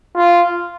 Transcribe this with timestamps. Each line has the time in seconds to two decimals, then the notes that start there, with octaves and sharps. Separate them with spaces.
0.17 F4